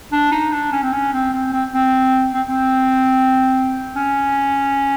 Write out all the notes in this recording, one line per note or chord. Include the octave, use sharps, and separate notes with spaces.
D4
D#4
D4
C#4
C4
C#4
C4
C4
C4
C4
C4
C4
C#4